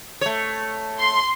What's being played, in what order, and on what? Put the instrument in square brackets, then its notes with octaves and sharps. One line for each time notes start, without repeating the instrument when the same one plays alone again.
[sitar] A3 C#5
[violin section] C6